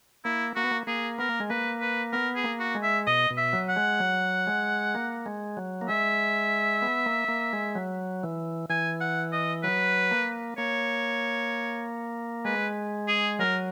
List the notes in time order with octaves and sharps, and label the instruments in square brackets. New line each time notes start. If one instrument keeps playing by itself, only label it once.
[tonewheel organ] A#3 [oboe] E4
[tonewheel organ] A#3 [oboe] F#4
[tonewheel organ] B3
A#3
[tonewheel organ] A#3 [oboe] G#4
[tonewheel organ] B3 [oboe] A#4
[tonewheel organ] A#3
G#3
[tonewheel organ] A#3 [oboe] B4
[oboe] B4
[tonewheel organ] B3 [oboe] A#4
[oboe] G#4
[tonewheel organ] A#3
[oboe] F#4
[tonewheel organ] G#3
[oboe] E5
[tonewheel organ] B2 [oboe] D#5
[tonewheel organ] B2
[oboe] E5
[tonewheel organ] F#3
[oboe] F#5
[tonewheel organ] G#3
F#3
G#3
A#3
G#3
F#3
A#3
[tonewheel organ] G#3 [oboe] E5
[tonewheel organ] B3
A#3
A#3
G#3
F#3
E3
[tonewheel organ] E3 [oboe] G#5
[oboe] F#5
D#5
[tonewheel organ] F#3 [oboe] B4
[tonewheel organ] A#3
[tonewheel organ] A#3 [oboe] C#5
[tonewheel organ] G#3 [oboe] B4
[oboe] G#4
[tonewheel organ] F#3 [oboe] A#4